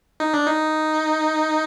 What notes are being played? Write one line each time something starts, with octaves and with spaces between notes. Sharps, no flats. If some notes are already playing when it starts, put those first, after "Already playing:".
D#4
D4
D#4